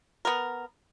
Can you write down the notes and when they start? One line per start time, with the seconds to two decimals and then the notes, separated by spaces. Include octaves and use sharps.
0.25 B3 A#4